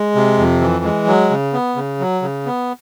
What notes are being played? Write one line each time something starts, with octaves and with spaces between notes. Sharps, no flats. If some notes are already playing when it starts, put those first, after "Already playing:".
Already playing: G#3
C3
F2
E3
G#3
F#3
C#3
B3
C#3
F#3
C#3
B3